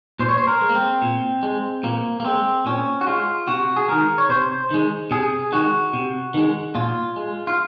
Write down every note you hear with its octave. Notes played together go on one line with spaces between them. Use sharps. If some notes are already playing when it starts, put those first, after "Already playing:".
A#2 C5
C#5
C5
A#4
G#3
A#3
C4
A#2
G#3
A#2 A#3
A#3
G#3 C4
A#2 C#4
F#4
G#3 F4
C3 F#4
G#4
D#3 G#3 A#4
C#5
C3 C5
D#3 G#3
C3 G#4
D#3 G#3 F#4
C3
D#3 G#3
A#2 F4
G#3
F4